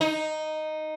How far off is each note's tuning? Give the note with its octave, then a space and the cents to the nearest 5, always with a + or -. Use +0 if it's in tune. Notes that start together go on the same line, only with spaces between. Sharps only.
D#4 -5